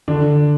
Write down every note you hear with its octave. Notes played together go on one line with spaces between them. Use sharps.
D3 D4